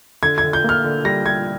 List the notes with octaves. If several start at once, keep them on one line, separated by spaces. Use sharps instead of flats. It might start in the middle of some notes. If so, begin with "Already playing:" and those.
D3 G#6
G#6
D3
G6
A#3 F6
D3
G3 A#6
G3 G#6